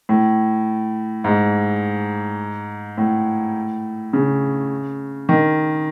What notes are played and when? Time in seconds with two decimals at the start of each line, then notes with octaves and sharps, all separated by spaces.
0.09 A2
1.24 G#2
2.97 A2
4.13 C#3
5.29 D#3